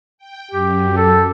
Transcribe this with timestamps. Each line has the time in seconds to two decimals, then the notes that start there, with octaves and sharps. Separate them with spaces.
0.18 G5
0.52 F#2 G4
0.97 A4